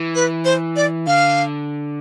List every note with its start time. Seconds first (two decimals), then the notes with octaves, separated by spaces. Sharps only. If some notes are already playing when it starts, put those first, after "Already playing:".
Already playing: E3
0.15 B4
0.45 C5
0.76 D5
1.07 D3 F5